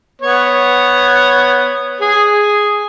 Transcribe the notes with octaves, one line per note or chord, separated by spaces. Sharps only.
B3 C#5
G#4